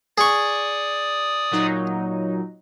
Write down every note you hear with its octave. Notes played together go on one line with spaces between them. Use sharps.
G#4 D5 C#6 D#6
A#2 F#3 D#4